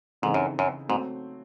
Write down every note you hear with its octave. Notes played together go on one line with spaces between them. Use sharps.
G#2 C#3 E3 C4 D#4 A4
F#2
F#2
G#2 F#3 A3 C4